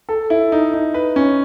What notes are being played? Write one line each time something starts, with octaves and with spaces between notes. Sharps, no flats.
A4
E4
D#4
D#4
B4
C#4